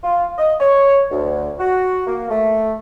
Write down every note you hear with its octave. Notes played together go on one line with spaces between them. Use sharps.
F4
D#5
C#5
D2
F#4
A#3
A3